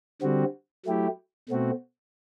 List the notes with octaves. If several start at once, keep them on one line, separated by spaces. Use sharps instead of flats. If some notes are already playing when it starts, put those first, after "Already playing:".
D3 G3 C4 F#4
F#3 A3 E4 G4
B2 A3 C4 F#4